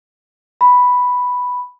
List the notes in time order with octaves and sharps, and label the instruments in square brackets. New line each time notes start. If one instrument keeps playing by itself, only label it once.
[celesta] B5